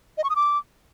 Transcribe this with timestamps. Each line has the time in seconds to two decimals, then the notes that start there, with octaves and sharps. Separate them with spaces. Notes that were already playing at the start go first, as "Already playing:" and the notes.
0.18 D#5
0.24 C#6
0.30 D#6
0.36 D6